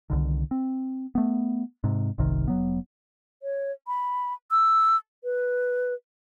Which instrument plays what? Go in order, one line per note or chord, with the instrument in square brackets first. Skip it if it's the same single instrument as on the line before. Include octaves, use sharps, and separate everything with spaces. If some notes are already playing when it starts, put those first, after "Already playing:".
[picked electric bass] C2 D3 D#3
C4
A3 B3
G#2 C3
G1 C2 C3 D#3
F1 F#3 B3
[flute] C#5
B5
E6
B4